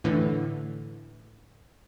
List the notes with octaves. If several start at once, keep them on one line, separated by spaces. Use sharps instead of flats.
A2 D3 E3